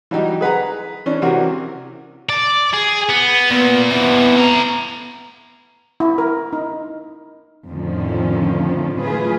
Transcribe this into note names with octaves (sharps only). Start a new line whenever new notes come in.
E3 F#3 G3 D#4 G4
G#4 B4 F#5 A#5
E3 C#4 D4
C3 E3 F#4 A#4
D5
G#4
B3
A#2 B3
C3 E3 B3
A3 A#5
E4
A#4
D#4
F2 A2 D3 D#3 F3 C#4
E3 F#3 A3 F4 G#4 B4